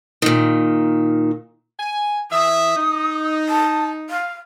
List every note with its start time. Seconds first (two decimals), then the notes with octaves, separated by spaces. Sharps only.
0.22 A#2 D#3
1.80 G#5
2.31 E3 E5 D#6
2.77 D#4
3.48 A5
4.09 F5